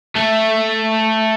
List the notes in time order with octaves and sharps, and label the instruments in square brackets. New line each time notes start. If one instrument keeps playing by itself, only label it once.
[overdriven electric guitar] A3